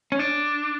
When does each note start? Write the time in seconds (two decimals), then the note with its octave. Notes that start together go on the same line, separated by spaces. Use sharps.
0.12 C#4
0.19 D4